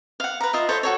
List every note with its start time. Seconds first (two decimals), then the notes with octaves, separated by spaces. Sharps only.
0.20 F5 F#5
0.41 B4 A#5
0.53 F4 D#5 E5
0.69 A4 C5 C#5 E5
0.83 F#4 A4 C#5